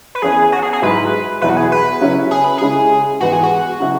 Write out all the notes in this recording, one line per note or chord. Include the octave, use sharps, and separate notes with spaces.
B4
E2 E3 C#4 E4 G#4
F#4
G#4
G#4
G#2 F#3 E4 B4
E2 B2 F#3 E4 B4
F#4
G#4
B4
C#3 F#3 C#4 E4
G#4
B4
C#3 G#3 C#4 E4 G#4
G#2 E3 B3 E4 F#4
G#4
F#4
C#3 F#3 E4